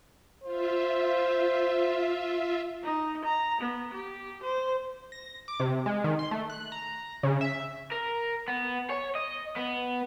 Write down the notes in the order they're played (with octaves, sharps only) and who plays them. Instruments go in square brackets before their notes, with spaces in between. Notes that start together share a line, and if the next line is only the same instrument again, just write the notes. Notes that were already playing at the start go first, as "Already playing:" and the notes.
[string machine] F4 E5 [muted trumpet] C5
[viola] D#4
A#5
B3
G4
C5
[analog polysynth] A#6
D6
C3
G#3
D#3
C6
A3
F#6
A#5
C#3
E5
[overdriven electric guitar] A#4
B3
C#5
D#5
B3